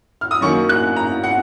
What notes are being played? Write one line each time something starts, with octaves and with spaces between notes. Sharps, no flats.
F6
D#6
F#2 D#3 F#3 A#3 C#6
F#6
A#5
F#5